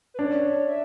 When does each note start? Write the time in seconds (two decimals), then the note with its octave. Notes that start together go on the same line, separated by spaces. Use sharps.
0.14 B4
0.19 D4 C#5
0.68 E5